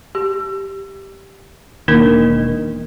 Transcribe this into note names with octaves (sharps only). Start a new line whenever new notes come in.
G4
E1 D#3 A#3 D4 A#4